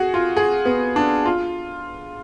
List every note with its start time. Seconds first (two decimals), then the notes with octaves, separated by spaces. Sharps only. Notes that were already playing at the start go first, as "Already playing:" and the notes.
Already playing: F#4 G#4
0.14 F4
0.37 G#4
0.65 B3
0.96 D4
1.26 F4